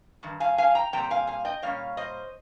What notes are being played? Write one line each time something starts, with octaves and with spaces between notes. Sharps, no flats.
G2 D#3
F5 G#5
F5 G#5
G5 A#5
A#2 G3 C4 G5 A#5
A#5
F5 G#5
F5 G#5
D#5 G5
A#2 G3 C#4 C#5 F5
C5 D#5